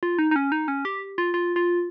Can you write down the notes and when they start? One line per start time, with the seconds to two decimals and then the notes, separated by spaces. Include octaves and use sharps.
0.03 F4
0.19 D#4
0.31 D#4
0.36 C#4
0.52 D#4
0.68 C#4
0.85 G4
1.18 F4
1.34 F4
1.56 F4